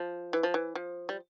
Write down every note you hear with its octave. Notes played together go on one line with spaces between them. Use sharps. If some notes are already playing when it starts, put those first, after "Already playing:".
Already playing: F3
E3
F3
E3
F3
G3